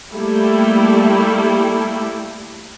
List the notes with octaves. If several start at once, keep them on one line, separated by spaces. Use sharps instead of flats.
G3 A3 A#3 E4 G4 A4